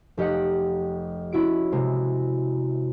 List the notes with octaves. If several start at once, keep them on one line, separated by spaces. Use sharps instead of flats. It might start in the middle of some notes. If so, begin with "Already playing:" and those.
F1 G4 D#5 F#5 C#7
C#4 E4 F#4 D7
C3 G#3